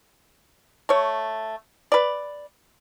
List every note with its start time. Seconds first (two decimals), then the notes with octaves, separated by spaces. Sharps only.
0.89 A3 C#5
1.92 B4 D5